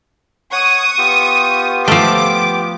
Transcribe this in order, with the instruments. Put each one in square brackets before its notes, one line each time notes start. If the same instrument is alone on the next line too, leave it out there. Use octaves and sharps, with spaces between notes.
[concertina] C#5 F#5 [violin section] C#6 D#6
[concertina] B3 F4 G4
[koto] F3 A3 [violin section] D6